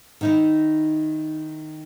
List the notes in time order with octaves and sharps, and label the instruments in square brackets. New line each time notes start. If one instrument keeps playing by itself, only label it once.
[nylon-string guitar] D#3 D#4 E4